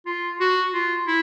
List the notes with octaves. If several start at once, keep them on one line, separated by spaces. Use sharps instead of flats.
F4
F#4
F4
E4